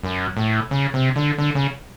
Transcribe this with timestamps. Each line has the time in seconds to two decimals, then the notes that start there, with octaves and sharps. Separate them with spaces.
0.04 F#2
0.37 A2
0.71 C#3
0.94 C3
1.16 D3
1.38 D3
1.55 C#3